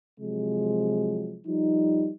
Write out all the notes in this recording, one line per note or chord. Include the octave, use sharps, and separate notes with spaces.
C3 F3 F#3 G#3
F3 G3 D#4